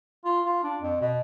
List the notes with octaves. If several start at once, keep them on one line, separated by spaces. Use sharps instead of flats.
F4
F4
D4
F2
B2